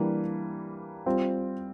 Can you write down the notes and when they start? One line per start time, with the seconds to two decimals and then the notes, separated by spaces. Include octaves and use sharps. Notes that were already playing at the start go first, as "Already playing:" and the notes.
Already playing: E3 G3 A#3 D4
1.06 G3 C4 F4